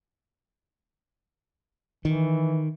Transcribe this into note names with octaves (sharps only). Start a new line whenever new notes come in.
D#3 E3